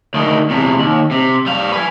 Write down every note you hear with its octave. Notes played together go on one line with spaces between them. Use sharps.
D2 D#3
E2 C3
D#2
C3
G3 F5
B4 G#5